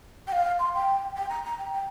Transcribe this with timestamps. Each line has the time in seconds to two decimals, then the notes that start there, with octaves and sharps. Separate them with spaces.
0.27 G5
0.32 F5
0.59 C6
0.75 G5
1.17 G5
1.30 A#5
1.45 A#5
1.59 G5
1.73 G5